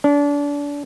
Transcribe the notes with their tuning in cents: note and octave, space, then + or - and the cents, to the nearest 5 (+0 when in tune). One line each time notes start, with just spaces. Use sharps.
D4 -30